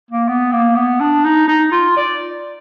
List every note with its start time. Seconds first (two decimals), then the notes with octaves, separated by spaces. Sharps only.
0.10 A#3
0.28 B3
0.53 A#3
0.76 B3
1.00 D4
1.25 D#4
1.48 D#4
1.72 F4
1.97 D5